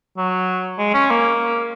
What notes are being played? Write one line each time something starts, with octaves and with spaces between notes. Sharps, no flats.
F#3
G#3
C#4
A#3